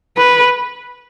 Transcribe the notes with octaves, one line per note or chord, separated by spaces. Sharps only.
B4